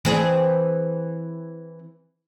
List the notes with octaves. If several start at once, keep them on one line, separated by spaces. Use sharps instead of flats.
E3 C4 G#4